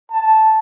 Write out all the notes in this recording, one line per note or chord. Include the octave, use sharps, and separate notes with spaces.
A5